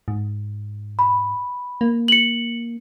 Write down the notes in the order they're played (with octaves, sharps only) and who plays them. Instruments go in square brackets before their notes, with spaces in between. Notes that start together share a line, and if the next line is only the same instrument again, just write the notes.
[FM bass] G#2
[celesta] B5
[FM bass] A#3
[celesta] C#7 F#7